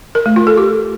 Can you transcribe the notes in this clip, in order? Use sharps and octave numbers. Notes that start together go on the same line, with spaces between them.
A#4
A3
F4
A4
G4